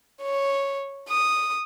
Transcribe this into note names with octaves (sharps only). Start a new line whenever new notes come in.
C#5
D#6